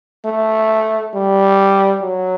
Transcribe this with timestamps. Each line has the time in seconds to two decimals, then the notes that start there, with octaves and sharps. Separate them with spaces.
0.26 A3
1.15 G3
2.02 F#3